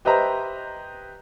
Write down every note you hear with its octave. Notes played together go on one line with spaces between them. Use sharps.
G4 B4 C5 D#5 E5 A#5